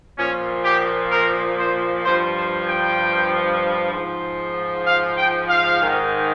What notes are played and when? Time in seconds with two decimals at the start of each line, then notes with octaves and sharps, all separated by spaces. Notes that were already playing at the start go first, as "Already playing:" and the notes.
0.17 A#2 F3 C#4
0.64 G4
1.11 A#4
1.58 C5
2.05 G2 F3 C5
2.36 C5
2.68 G5
3.92 G#2 F3
4.87 F5
5.18 G5
5.49 F5
5.80 G#2 D#3